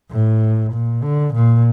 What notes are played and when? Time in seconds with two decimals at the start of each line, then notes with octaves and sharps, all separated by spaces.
0.11 A2
0.73 A#2
1.03 D3
1.34 A#2